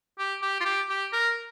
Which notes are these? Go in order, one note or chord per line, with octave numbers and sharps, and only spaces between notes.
G4
G4
F4
G4
G4
A#4